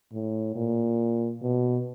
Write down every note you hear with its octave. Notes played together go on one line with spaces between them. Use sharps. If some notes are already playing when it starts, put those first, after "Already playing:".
A2
A#2
B2